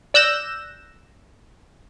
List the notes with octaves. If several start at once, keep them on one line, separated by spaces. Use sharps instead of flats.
D5 E6 F#6 G6 A#6 E7